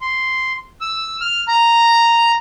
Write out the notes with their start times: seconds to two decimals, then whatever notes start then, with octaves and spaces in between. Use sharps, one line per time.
0.01 C6
0.81 E6
1.21 F6
1.48 A#5